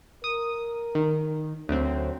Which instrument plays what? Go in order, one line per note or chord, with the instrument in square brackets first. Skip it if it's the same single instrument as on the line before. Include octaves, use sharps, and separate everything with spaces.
[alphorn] A#4 [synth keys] D#6
[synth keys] D#3
[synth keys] D2 C4 [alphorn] F#3